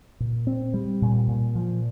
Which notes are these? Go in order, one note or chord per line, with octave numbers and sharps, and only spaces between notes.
A#2
C4
G3
A#2
A#2
F3